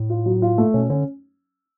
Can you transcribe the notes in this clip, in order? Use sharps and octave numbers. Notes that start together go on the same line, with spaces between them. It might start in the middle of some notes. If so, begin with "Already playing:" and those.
Already playing: A2
F4
F#3
F4
A3
B2 C#4
D3 C#4